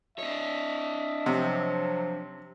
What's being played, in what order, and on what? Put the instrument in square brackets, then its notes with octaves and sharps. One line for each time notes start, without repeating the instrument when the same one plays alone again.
[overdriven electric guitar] D4 C#5 [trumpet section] D#5 E5
[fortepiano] C3 [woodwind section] F3 F#3